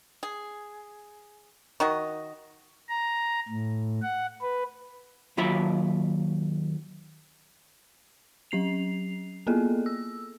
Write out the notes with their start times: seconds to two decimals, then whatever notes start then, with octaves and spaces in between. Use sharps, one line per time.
0.23 G#4
1.80 D#3 F#4 D#5
2.89 A#5
3.48 A2
4.02 F#5
4.41 B4
5.37 D#2 F#3 F4 E5 B5
8.51 F#3 C#4 C7 F7
9.47 A#3 B3 G#4 A4
9.86 E6